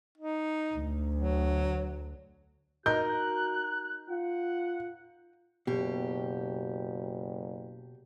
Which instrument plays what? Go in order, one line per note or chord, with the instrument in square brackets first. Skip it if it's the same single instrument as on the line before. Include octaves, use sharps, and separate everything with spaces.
[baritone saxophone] D#4
[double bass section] D2
[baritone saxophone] F#3
[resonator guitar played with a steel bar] D#4 A#4 [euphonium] F#4 [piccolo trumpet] F#6 [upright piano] G6
[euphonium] F4 [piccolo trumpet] F#5
[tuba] F#1 [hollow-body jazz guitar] B2 [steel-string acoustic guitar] G4